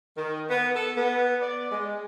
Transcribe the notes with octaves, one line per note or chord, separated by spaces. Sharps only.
D#3
B3
A4
B3
D5
G#3